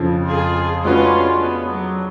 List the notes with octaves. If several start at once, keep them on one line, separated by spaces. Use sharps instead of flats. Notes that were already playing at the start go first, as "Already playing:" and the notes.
Already playing: F2 C#3 F3
F4 G#4
G#3 C#4 D4 F4 F#4 B4
B3
F#3